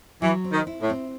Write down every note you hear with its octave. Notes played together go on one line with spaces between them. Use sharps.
E3 F#3
C4
D#3
E4
A2
C4